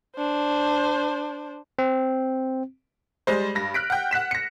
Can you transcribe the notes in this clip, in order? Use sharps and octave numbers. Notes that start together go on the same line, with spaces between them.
D4 C5
C4
G3 G#3 C5
G2 A#6
F6 F#6 B6 D7
F#5 G5
F#5 F#6 B6 E7
A#6 C#7